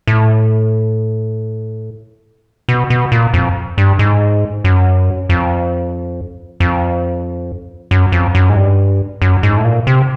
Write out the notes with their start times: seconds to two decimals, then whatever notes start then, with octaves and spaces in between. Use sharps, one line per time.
0.07 A2
2.69 B2
2.90 B2
3.12 A#2
3.34 F2
3.78 G2
3.99 G#2
4.64 F#2
5.29 F2
6.60 F2
7.91 F#2
8.12 F2
8.35 F#2
8.49 G#2
8.56 G2
9.22 F#2
9.43 G#2
9.57 A2
9.65 A#2
9.87 C3